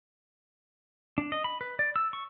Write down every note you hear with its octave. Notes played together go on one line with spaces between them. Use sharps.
D4
D#5
B5
B4
D5
E6
C#6